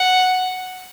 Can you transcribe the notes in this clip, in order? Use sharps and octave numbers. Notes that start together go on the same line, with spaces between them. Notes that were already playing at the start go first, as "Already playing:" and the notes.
Already playing: F#5